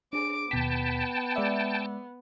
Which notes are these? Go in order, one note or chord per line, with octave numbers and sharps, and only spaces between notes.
D4 G#4 D6 D7
D#2 B2 B3 G5 A5 B6
G#3 D5 E5